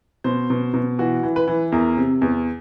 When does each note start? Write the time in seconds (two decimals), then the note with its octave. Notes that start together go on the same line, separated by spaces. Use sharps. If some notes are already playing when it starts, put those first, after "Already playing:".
0.24 B2 C5
0.50 B2
0.74 B2
0.99 E3 F#4
1.23 E3
1.36 B4
1.48 E3
1.72 E2 A#4
1.97 C3
2.22 E2